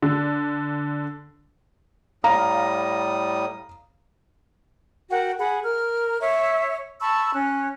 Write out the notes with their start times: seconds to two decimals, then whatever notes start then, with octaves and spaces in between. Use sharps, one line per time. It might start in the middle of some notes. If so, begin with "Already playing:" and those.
0.02 D3
2.24 A2 G3 F5 A#5 D#6
5.11 F#4 A#4 F#5 G5
5.39 G#4 F#5 B5
5.63 A#4 F6
6.21 C#5 E5
7.01 A5 B5 C#6 E6
7.34 C#4 F#6